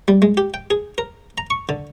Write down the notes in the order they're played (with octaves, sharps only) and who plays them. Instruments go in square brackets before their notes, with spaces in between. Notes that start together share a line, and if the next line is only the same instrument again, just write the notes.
[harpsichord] G3
G#3
G4
G5
G#4
A#4
A#5
C#6
D3